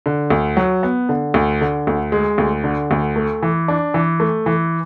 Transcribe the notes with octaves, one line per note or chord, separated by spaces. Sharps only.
D3
D2
F#3
B3
D3
D2
D3
D2
G#3
D2
D3
D2
A3
E3
D4
E3
A3
E3